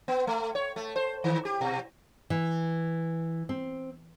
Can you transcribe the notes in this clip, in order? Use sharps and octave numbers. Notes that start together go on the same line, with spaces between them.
B3
A3
C#5
A3
C5
D#3
G4
B2
E3
C4